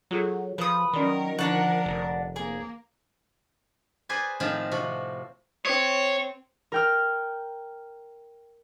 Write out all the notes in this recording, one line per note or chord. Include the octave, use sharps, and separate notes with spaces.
F#3 F4 G#4 A4
F3 B4 D#6
D#3 F#3 C#4 A#4 D5 C6
D3 F3 D4 A#4 F#5
F1
A#3 G#4
G#4 B4 C5 D5 G#5
A2 D#3 F3 C4
C3 F3 F#4
C4 C#5
A#4 G5 F6